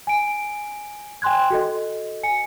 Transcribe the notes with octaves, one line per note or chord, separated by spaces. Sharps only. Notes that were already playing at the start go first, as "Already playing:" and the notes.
G#5 D7
G5 G#5 C6 F#6 G#6
F#4 A4 D#5
G#5 C#7